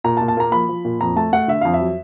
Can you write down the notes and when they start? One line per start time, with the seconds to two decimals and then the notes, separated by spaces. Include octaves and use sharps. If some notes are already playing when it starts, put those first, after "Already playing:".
0.04 A#2 A#5
0.17 A5
0.21 A#2
0.28 A5
0.37 A#3 A#5
0.52 F3 B5
0.69 F3
0.85 A#2
1.01 F2 A#5
1.16 A3 A5
1.33 A3 F#5
1.48 D3 E5
1.61 F2 F5
1.74 E5
1.80 F#3